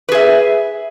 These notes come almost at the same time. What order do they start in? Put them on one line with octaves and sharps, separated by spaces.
B4 G#4 E5